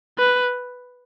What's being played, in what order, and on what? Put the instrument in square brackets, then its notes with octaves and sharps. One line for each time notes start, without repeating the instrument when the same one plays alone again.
[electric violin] B4